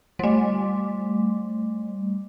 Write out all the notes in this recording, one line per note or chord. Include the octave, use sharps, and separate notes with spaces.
G3 A3